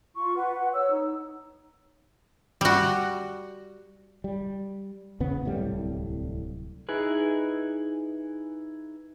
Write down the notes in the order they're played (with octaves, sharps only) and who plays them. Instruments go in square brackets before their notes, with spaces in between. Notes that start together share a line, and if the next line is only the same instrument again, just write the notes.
[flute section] F4 C#6
B4 F#5
F#5
C#5 E6
D#4
[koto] G3 F#4
[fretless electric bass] G3
E2 C#3 B3
D1 C2 A2 G3
[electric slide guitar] D#4 E4 G#4 B4